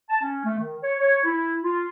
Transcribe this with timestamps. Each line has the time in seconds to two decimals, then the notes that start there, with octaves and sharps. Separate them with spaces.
0.10 A5
0.22 C#4
0.45 A3
0.58 D#3
0.83 C#5
1.00 C#5
1.25 E4
1.64 F4